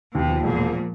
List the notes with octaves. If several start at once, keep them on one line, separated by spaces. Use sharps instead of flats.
D#2 B2
F3
E1 A#2
F3